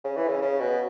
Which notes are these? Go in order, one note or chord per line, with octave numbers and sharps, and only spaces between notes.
C#3
E3
C#3
C#3
B2